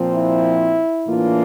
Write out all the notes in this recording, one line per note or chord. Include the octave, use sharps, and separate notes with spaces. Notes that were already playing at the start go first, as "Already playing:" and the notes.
Already playing: A#2 F3 C4
E4
A2 E3 A#3 D4 F4